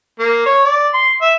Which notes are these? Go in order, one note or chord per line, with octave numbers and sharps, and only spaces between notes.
A#3
C#5
D5
C6
E5